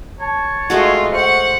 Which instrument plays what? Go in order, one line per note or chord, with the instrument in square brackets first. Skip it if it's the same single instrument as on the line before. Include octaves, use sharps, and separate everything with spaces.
[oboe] C#5 [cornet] A5
[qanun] G#3 A3 F#4 [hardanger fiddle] D#4 F4
[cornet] C5 [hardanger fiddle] F#5 [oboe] C#6